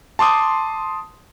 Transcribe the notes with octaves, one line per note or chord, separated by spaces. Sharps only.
A5 C6 D6 D#6